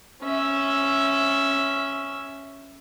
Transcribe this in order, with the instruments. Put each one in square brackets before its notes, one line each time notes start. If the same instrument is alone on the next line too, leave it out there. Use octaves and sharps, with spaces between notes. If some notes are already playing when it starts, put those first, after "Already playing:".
[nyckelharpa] C#4 E5